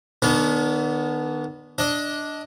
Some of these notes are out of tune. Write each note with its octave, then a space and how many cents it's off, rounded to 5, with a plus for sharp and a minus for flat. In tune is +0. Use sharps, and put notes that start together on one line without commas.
D#3 -40 B3 +0 D4 -45
D4 +0 D#5 +20